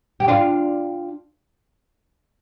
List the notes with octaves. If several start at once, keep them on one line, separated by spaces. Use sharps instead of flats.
G4
D4 F4